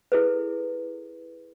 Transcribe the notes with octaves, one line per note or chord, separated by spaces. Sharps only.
E4 G#4 A4 B4